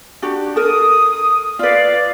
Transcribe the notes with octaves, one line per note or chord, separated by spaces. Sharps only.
D4 F#4 G4
A4 A#4 D#6
F4 B4 D5 F5